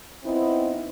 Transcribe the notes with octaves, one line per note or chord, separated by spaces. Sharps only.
B3 C4 D#4 E4